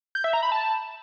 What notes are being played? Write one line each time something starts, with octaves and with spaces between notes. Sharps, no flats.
G6
E5
A#5
B5
A5